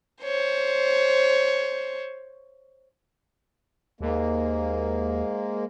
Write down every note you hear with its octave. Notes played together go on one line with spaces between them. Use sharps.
C5 C#5
D#2 G#2 G#3 A#3